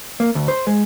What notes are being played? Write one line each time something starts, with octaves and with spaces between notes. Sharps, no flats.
A#3
D2
C5
G#3